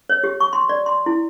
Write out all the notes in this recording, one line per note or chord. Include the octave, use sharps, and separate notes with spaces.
C#5
G4
C#6
C6
D5
C6
E4